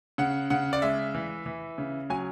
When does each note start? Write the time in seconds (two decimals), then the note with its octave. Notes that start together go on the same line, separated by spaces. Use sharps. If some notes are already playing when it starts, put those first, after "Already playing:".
0.18 C#3 F#5
0.50 C#3 F#5
0.73 D5
0.82 G#3 E5
1.15 E3
1.46 E3
1.78 C#3
2.10 F#3 G#5